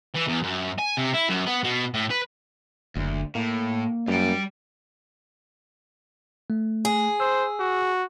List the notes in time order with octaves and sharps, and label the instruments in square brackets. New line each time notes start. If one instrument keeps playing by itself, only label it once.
[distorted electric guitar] E3
E2
F#2
G#5
C3
E4
F#2
B3
B2
A2
B4
[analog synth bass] F#1 [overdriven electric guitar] D2
[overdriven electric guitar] A2 [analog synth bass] A#3
[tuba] F#2 [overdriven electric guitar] G3 G5
[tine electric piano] A3
[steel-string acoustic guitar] G#4
[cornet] C5 [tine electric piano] E6
[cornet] F#4